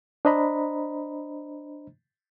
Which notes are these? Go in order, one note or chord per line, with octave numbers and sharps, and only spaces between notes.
D4 C5 D#5 A#5 B5